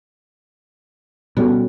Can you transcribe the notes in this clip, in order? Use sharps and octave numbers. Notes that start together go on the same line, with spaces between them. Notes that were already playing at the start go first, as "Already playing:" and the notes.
B2 G3 B3 C#4 F#4 A4